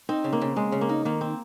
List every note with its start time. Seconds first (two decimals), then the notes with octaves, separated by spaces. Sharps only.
0.09 C4 D#4
0.24 C#3
0.33 A#3
0.42 C#3
0.56 C#3 G#3
0.72 C#3
0.81 A#3
0.89 D#4
1.05 D#3 A#3
1.21 C4